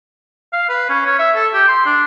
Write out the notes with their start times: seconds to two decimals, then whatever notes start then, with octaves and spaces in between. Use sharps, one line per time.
0.53 F5
0.69 B4
0.89 C#4
1.06 C#5
1.19 E5
1.35 A4
1.53 G4
1.68 C6
1.85 D4